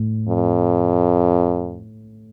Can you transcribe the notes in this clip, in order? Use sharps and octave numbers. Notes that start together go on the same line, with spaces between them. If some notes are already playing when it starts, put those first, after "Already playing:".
Already playing: A2
F2